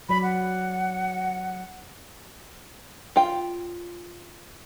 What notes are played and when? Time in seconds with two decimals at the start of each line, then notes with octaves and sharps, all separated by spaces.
0.09 F#3 D5 B5
0.23 F#5
3.16 F4 G5